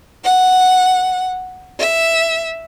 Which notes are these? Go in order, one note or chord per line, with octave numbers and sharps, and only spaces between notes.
F#5
E5